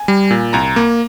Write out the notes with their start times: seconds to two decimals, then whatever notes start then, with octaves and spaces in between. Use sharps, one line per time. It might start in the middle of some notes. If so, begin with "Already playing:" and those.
Already playing: G#5
0.08 G3
0.31 A#2
0.53 C2 A#5
0.76 A#3